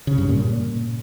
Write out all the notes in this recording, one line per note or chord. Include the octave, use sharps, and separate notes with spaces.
C#3
G2
A#2